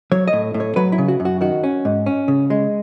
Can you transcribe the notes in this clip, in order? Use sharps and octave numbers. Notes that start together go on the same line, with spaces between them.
F#3 C#5
D#5
A2
A2
C#5
F#3 B4
E4
C#3
F#4
F#2
F#4
D#3 F#4
C#4
G#2
C#4
C#3
G#3